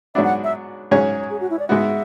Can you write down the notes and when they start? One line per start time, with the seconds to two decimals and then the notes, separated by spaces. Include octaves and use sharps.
0.15 G#2 F#3 B3 D4 E5
0.24 F#5
0.44 E5
0.91 G#2 F#3 C#4 G#4 C#5
1.30 G#4
1.40 F#4
1.50 E4
1.59 D5
1.69 G#2 G#3 B3 F#4 E5